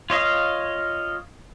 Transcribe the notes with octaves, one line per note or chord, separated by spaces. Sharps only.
F4 C#5 D#5 F5